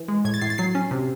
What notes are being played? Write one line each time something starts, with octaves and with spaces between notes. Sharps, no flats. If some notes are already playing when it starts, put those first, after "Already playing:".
Already playing: E3
G#3
A2 G#6
A6
A2 C7
A6
F#3 C7
C#4
C3